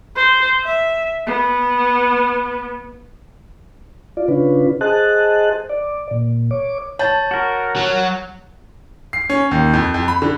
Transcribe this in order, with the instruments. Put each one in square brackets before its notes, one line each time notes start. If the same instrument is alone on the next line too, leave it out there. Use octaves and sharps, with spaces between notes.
[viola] C5
E5
B3
[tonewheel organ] F4 D5
C#3 C#4 D4 F4 B4
G#4 C5 D#5 A5 F#6
D5
A#2
C#5 D6
[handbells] C#5 G6 A6 [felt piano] A5
[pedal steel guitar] F#4 A#4
[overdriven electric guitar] F#3
[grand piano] C7
C#4
D#2
F2
F2
B5
D3